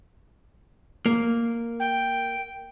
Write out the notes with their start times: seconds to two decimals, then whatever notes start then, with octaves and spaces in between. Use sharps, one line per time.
1.06 A#3
1.79 G5